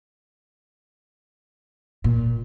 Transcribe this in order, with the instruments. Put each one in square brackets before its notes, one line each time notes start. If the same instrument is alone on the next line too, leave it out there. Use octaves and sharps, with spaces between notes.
[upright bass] A#2